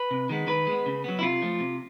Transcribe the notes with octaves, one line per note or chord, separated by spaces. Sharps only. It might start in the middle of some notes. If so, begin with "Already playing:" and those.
Already playing: B4
C3
D#3 G#3 B3
D#3 B4
G#3 B3
C#3
F#3 B3
E4
C3 F4
F3 A3
C3